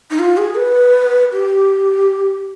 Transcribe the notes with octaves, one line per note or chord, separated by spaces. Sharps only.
D#4
F4
G#4
B4
G4